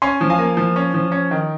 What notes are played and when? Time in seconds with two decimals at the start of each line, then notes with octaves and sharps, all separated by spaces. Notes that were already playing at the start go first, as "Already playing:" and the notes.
0.02 C#4 G#5 C6
0.21 F3
0.30 F5 G#5
0.39 A#3
0.57 F3
0.76 C#4
0.94 F3
1.12 C#4
1.31 D#3